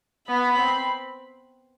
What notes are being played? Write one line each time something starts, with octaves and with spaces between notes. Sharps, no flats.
B3 B5
C4